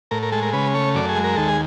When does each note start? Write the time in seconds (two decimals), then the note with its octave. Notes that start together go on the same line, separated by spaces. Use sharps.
0.11 A2 A#4
0.23 A#4
0.32 G#3 A4
0.43 A#4
0.53 C#3 B4
0.74 A3 C#5
0.95 F#2 D5
1.09 G#4
1.16 G#3
1.24 A#4
1.36 D#2 A4
1.48 G#4